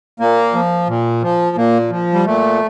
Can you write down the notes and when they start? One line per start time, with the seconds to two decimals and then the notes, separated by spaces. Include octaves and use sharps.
0.20 A#2 A#3
0.54 F3
0.88 A#2
1.22 F3
1.56 A#2 A#3
1.91 F3
2.13 G3
2.26 A#2 A3